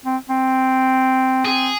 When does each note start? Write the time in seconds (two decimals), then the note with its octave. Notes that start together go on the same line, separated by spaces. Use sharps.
0.06 C4
0.29 C4
1.45 C4 G#4